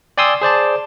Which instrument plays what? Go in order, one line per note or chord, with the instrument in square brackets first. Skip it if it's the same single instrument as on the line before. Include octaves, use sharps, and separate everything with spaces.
[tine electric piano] D5 G5 G#5 C6 D#6 E6
G#4 C5 D5 A5